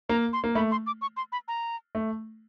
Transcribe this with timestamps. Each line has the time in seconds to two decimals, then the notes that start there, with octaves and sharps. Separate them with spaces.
0.09 A#3 A#5
0.33 C6
0.44 A#3
0.55 A3 B5
0.72 C6
0.87 D6
1.02 C#6
1.17 C6
1.32 B5
1.48 A#5
1.95 A3